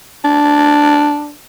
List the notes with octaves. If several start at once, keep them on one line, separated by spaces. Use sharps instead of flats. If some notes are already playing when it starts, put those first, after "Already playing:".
D4